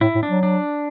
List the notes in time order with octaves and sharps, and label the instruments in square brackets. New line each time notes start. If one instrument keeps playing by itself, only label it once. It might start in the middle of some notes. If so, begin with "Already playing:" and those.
[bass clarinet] A2 [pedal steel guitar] E4
[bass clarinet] A2
[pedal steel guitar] D4
[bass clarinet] F#3
[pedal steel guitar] D4